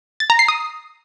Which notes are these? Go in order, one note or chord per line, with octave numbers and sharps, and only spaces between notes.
A6
A#5
C7
D#6